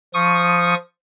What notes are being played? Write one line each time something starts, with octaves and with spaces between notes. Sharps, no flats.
F3 C#6 D#6